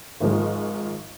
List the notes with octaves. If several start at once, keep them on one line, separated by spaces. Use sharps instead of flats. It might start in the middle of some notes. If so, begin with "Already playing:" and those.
G#1 G#2 F3 G#3